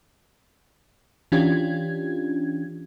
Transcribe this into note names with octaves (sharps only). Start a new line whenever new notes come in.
E3 C#4 D4 F4 G4 G#6